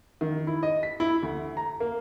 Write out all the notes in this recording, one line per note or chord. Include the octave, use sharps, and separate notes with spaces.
D#3
E4
D#5
B6
E4
D2
A#5
A#3